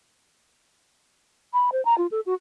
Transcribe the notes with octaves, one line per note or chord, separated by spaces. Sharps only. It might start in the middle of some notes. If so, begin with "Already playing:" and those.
B5
C5
A#5
F4
A4
F#4